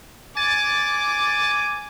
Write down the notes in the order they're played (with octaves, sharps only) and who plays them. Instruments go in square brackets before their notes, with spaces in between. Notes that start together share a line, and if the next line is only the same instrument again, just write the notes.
[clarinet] G#5 [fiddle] D6 [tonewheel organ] A6